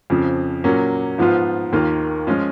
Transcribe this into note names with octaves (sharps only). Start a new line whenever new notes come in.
F2 C#3 F3
A#2 F#3 A#3 C#4
G#2 F3 B3 F4
D#2 D#3 A#3 F4
F3 G#3 C#4 F4